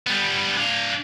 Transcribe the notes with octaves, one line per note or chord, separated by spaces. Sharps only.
G3 B3
D4 F5